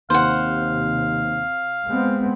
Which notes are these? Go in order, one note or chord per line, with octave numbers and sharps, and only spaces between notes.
D#2 C3 C5 F5 F#5
G#3 B3 C4